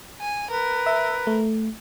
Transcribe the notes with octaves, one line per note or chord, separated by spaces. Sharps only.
G#5
A#4 B4
E5
A3